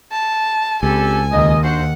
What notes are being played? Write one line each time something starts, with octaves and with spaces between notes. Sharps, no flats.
A5
C#2 C4 G4 A4 G#5
D#2 D#5
D4 F#4 C5 F#5